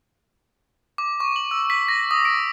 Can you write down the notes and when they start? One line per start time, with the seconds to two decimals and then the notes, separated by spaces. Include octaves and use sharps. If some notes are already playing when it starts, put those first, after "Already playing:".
0.98 D6
1.20 C#6
1.36 F#7
1.51 E6
1.70 B6
1.88 A#6
2.11 D#6
2.25 D7